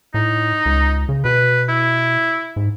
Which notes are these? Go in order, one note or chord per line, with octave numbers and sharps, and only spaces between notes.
A2 D#4
C#2
C#3
B2 B4
E4
G#2